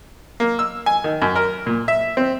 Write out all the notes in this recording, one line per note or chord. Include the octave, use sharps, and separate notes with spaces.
A#3
E6
G#5
D#3
F#2
A#4
A#2
E5
C4